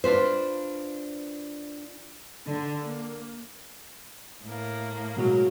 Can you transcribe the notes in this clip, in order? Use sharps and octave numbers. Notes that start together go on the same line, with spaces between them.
D4 F4 B4 C5
D3
A#3
A2 A#3
B2 F#3 G#3